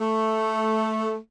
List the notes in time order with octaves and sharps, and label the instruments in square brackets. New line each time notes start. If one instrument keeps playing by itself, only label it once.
[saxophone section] A3